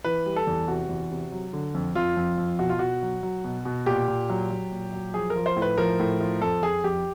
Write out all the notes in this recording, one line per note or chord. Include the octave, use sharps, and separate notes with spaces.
E3 B4
G3
A4
E2
C3 F#4
E2
C3
F#3
D3
F2
F2 F4
F2
F2
B2 F#4
F4
B2 F#4
F#3
F#3
B2
B2
A#2 G4
A#2
F#3
F#3
A#2
F#3
F3 G#4
A#4
F3
C5
A2
B4
F3 A#4
A2
F3
F2 A4
F2 G#4
F2 G4